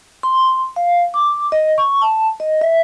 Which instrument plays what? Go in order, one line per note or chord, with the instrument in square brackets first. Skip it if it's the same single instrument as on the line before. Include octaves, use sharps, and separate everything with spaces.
[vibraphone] C6
F5
D6
D#5
C#6
A5
D#5
E5